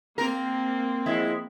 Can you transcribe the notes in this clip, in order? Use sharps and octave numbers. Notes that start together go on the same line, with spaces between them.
A#3 C4 A#4
F3 G#3 E4